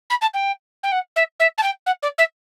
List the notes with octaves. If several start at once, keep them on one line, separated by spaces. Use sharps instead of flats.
B5
A5
G5
G5
F#5
E5
E5
A5
G5
F#5
D5
E5